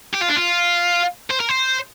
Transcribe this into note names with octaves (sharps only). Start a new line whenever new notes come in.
G4
F4
D4
F4
C5
A#4
C5